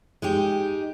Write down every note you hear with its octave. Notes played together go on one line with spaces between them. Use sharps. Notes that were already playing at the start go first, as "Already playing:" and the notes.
G#3 D#4 G4